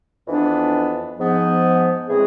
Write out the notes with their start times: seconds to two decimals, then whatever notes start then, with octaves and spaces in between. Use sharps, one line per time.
0.27 F2 E3 B3 D4
1.17 G#2 F3 B3
2.08 A2 E3 G#3 C4 G#4